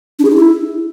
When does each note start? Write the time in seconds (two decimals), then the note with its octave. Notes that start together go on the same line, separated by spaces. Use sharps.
0.19 D4
0.25 G#4
0.30 D#4
0.36 E4